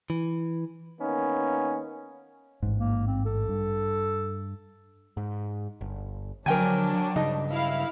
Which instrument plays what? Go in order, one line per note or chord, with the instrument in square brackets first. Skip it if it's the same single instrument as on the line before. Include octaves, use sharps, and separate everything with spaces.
[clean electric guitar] E3
[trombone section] D#3 A#3 B3 C#4 D#4
[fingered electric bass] A1 G#2
[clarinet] A#3
C4
A4
[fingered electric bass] G2
[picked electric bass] G#2
G1
[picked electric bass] D3 F3 [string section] F#3 D4 [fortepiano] A#4 G5 G#5
[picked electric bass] G2 C#3 [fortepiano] D#4
[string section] E4 F5